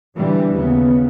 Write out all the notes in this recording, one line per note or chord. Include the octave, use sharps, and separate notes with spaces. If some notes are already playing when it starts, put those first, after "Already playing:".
B2 D3 E3 G3
D#2 C#3 B3